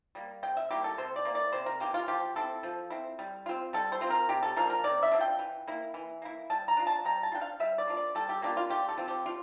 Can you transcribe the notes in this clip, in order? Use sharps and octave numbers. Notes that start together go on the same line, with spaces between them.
G3 A#3
C3 G5
E5
G3 A#3 E4 G4
A4
C3 C5
D5
E3 A#3
D5
C3 C5
A#4
E3 A#3 G4
F4
F3 G4
C4 E4 A4
F3
C4 E4
G3
C4 F4
G3 A4
C5
C4 F4
A#4
C3 G4
A4
F3 A#3 D4 A#4
A#4
C3 D5
E5
F3 A#3 D4
G5
E3
A#3 E4
E3
A#3 E4
G3 A5
A#5
D4 F4
A5
G3 A#5
A5
F4
D4 G5
F5
G3 E5
D5
A#3 D4 F4
D5
G3 A4
G4
A#3 D4 F4 G4
F4
D3 G4
A4
F3 C4 F4
G4
D3 F4